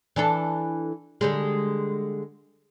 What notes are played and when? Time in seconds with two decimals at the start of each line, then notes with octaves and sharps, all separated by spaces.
0.16 E3 D4 A4
1.21 D3 G3 G#3